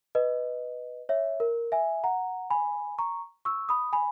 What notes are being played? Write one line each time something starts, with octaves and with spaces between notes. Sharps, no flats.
B4 D#5
C#5 E5
A#4
E5 G#5
F#5 A#5
G#5 B5
A#5 C#6
C#6 E6
B5 D#6
G#5 B5